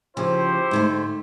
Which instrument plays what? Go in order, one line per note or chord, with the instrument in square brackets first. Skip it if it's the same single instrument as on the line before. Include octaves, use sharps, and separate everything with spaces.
[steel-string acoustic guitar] C#3 F3 [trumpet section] E4 G4 C5
[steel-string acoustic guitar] G#2 D3 A3